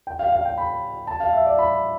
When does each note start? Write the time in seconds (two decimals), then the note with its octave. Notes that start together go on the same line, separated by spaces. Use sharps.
0.07 G5
0.19 F5
0.32 F5
0.45 G5
0.58 B5
1.07 A5
1.20 F5
1.33 E5
1.46 D5
1.58 B5